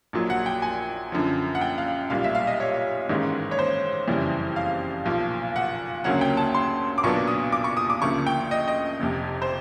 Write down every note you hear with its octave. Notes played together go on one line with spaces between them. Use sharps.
A#1 A#2 F#3
F#5
G5
G#5
F#2 D3 F3
F#5
G5
F5
B1 A#2 G3 F5
E5
F5
D#5
C#5
A1 G#2 D#3 G#3 C#4
C#5
C5
F#1 F2 C#3 E3 G3
F5
B1 A#2 F3
F#5
D2 C#3 F#3 A#3 C#4 F#5
G5
A5
C6
D6
B1 A#2 F#3 B3 D4 C#6
D#6
D6
C#6
D#6
D6
D2 C#3 F3 A#3 C#6
G5
D#5
D#5
F1 F2 C3
C5